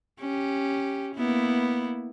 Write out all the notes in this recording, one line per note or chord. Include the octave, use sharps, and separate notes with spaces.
C#4 G4
A#3 B3 E4